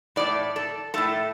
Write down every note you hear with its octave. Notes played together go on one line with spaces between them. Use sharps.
A2 A3 D5
A4
A2 A3 A4